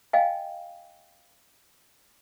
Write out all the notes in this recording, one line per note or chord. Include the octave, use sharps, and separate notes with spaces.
D#5 F5 G5 G#5